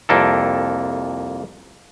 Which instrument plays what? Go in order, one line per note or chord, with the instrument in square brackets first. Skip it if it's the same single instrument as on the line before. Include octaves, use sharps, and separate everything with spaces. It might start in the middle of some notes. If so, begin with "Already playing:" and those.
[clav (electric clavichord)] C2 F2 A#3 A4